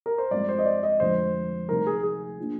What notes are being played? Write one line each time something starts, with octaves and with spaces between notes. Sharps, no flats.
A#4
C5
G2 F3 G#3 C4 D5
C5
D#5
D5
D#5
F1 F2 D3 G#3 C5
D2 C3 G3 C4 D#4 A#4
G#4
G#4
F3 A#3 D4